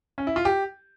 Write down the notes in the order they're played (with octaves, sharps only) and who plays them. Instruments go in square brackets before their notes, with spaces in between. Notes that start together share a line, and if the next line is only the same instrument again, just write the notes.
[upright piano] C#4
E4
F4
G4